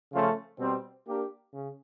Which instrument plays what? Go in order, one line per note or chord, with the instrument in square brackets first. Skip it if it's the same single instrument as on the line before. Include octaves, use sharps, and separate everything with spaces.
[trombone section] C#3 F3 A3 C#4 F4
B2 G3 C4
A#3 D4 G4 A#4
C#3